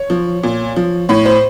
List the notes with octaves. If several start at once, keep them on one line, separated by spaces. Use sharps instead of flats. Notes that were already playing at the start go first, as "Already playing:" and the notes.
Already playing: C#5
F3
A#2
F3
A2 C#5
C5